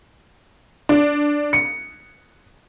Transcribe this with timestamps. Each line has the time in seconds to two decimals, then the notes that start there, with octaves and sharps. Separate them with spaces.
0.89 D4
1.53 C#7